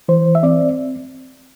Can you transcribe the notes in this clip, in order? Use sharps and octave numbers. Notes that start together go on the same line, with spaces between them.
E3 C5
E5
C4 D5